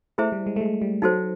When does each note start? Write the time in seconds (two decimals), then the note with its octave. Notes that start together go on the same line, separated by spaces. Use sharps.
0.18 A3 E4 G#4 C5 E5
0.32 G3
0.47 G#3
0.56 A3
0.61 G#3
0.82 G3
1.02 F#3 D#4 F#4 A4 C5